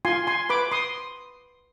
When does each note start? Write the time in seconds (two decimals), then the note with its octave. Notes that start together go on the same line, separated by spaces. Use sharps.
0.05 F4 G#5 C6
0.27 G#5 C6
0.49 B4 B5 D6
0.72 C6 D#6